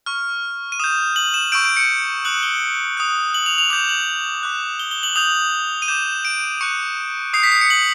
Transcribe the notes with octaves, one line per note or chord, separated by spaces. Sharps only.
C#6 F6
D#7
D#6 G6 E7
F#7
E7
C#6 E6 G6 D7
D7
C#7
D#6 F#6 F#7
G7
D#6 F#6
F#7
F7
F7
D6 G6 F7
F#7
D6 F#6
G7
G7
F#7
D#6 G6 F7
D#7
D6 G6 E7
D7
C#6 F#6 C#7
D#6 G6 C7
B6
C7
C#7
F#7